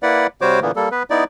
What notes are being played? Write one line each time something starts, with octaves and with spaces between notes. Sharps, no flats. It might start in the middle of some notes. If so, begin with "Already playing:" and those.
A#3 E4 B4 D5 F#5
C3 G3 F#4 C5 C#5 D6
A#2 D3 E3 A#3 B3
G3 A#3 A4
B3 B4
B3 D#4 E4 D5